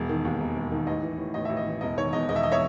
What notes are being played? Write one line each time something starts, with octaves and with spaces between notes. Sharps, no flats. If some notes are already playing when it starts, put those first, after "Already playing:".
Already playing: E1 E3
D#3
D#2
E1
E1
D#3
A1 D#5
E3
A2
A1 D#5
A1 E5
D#5
E3
E1 D#5
D#3 C#5
E2 D#5
E1 D#5
E5
D#5
C#5 E5